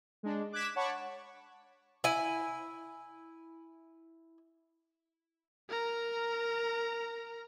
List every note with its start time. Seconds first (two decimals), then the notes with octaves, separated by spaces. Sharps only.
0.23 G#3 D4
0.52 D6 F#6 G#6 B6 E7
0.76 C#5 F#5 A5 B5 C#6 D6
2.04 E4 G#5
5.69 A#4 A#5